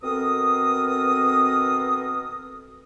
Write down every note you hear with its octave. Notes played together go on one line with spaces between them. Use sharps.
B2 D#3 C4 A4 A#4 D#6